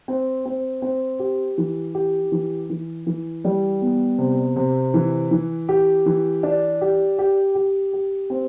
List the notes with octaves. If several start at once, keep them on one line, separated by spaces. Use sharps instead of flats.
C4
C4
C4
G4
E3
G4
E3
E3
E3
G3
B3
C3
C3
E3
E3
G4
E3
D4
G4
G4
G4
G4
C4